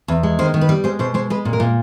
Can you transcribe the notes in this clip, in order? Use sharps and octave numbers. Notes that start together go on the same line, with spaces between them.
E2
G#3
D#3 C5
D#3
B4
G3
G#3 C5
B2 C5
G#3 C5
G#3 B4
A#2
A#4
A#2